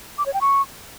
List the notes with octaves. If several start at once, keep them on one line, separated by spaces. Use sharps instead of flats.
D6
C#5
G5
C#6